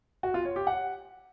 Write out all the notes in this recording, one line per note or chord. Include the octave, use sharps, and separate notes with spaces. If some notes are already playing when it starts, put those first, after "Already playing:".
F#4
F4
C#5
G4
F#5